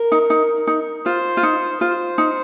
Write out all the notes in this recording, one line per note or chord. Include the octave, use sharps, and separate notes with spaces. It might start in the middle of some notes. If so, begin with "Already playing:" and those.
Already playing: A#4
D#4
D#4
D#4
F4 C5
F4
D#4
F4 C5
D#4